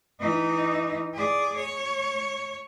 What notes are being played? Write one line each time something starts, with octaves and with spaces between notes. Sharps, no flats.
E3 D#4
G#4 D5
C#5